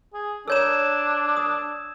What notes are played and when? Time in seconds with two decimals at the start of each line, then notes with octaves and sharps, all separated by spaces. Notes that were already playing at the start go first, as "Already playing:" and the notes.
0.14 G#4
0.48 D4 A4 C#5 A#5 E6 G#6 E7
1.37 D#6